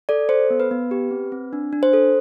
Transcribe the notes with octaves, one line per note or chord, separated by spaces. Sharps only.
A4 D5
A4 C5
B3
B4
B3
G4
C4
C4
D4
D4
C5
A4